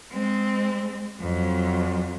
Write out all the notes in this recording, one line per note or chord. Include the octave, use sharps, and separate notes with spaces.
G#3 C4
F2 F#3